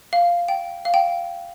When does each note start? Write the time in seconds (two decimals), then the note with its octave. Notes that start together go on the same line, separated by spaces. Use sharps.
0.13 F5
0.48 G5
0.85 F5
0.94 G5